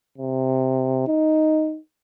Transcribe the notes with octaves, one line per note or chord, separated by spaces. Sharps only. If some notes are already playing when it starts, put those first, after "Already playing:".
C3
D#4